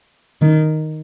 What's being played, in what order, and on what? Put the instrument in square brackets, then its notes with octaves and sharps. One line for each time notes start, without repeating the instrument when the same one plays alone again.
[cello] D#3